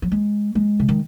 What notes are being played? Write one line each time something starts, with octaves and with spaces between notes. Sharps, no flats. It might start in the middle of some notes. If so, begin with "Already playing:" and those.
F#3
G#3
G#3
C#3
D#3